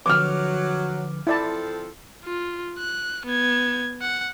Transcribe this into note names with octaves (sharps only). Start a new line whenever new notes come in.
D3 F3 F#3 B4 D6 F6
F3 C4 E4 A4 D5 A5
F4
F#6
B3 G#6
F#5